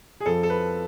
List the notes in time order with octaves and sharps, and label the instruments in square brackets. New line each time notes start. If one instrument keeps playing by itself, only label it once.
[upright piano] G#4
F2 F3 A4
A4
B4